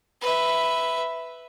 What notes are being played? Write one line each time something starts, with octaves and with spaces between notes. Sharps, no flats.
B4 E5